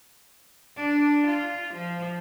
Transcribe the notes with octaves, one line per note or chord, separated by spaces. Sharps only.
D4
F4
F3